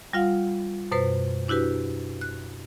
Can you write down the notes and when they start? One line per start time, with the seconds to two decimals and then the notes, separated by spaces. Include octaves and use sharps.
0.13 G3 F4 F5 F#5
0.92 F#2 B2 B4 C5
1.48 D4 E4 F#4 G4 B4
2.21 F#6